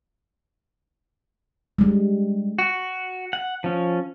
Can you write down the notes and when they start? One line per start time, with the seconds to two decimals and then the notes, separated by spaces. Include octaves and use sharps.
1.79 G3 G#3
2.59 F#4
3.33 F#5
3.64 F3 C#4